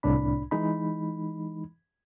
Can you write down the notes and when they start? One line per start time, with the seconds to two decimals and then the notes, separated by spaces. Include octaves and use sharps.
0.03 C2 A2 D4 B5
0.51 E3 G#3 D#4 B5